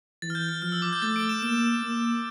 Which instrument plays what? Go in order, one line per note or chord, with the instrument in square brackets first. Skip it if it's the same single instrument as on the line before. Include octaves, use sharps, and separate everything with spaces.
[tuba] E3 [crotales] A6
[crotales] F6
G6
F6
[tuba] F3 [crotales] F6
[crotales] E6
D6
G6
[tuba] A3 [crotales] A6
[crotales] D7
E7
[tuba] A#3 [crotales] E7
[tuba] A#3